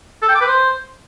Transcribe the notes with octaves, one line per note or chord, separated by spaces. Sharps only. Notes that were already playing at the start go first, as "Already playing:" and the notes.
A4
G5
D6
B4
C5